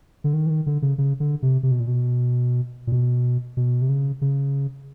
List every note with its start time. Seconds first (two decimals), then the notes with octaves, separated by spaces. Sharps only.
0.24 D3
0.33 D#3
0.46 E3
0.50 D#3
0.66 D3
0.82 C#3
0.98 C#3
1.20 D3
1.42 C3
1.63 C3
1.71 B2
1.80 A#2
1.87 B2
2.87 A#2
2.92 B2
3.57 B2
3.82 C3
3.89 C#3
4.21 C#3